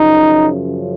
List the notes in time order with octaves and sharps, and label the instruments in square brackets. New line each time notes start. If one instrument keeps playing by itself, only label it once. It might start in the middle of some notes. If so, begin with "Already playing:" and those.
Already playing: [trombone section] F#2 C#3 F3 D#4